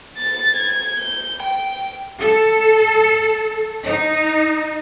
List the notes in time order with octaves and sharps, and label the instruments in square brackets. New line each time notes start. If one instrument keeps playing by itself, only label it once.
[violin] A6
G#6
G6
G5
[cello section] A4
D#4